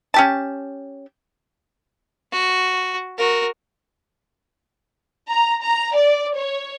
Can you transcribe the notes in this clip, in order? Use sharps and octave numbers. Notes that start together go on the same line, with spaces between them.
C#4 G4 A5
F#4
F#4 A#4
A#5
A#5
D5
C#5